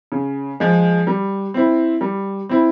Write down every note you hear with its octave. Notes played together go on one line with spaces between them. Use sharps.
C#3
F3 G#3
G3
C4 E4
G3
C4 E4